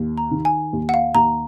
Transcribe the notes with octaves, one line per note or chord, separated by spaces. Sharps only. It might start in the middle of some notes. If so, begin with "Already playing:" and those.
Already playing: D#2
A#5
D#3
G#5
D#2
F#5
F5
D#2 A#5